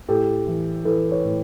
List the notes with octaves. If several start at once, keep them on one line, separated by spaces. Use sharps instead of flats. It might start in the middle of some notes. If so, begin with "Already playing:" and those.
A2 G4 A4
E3
E3 A4 B4
B4 C#5
A2